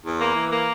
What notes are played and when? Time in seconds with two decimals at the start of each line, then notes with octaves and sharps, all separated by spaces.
0.04 E2
0.20 A#3
0.35 E3
0.51 A#3